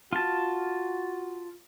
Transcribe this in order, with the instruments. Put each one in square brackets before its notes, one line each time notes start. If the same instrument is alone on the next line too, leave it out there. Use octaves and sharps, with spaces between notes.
[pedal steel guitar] F4 A5 [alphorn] F#4